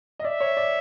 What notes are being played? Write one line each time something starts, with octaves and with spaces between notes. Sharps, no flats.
D#5
D5 E5
C#5
D5